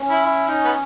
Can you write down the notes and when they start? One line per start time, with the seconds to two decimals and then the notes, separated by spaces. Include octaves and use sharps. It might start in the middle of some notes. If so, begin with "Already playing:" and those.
Already playing: C#4
0.09 E4
0.24 E4
0.48 D#4
0.64 B3